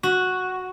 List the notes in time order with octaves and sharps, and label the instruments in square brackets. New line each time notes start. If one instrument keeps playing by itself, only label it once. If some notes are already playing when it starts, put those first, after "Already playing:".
[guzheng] F#4